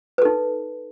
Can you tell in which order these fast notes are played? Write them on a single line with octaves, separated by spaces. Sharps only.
B4 A4 D#4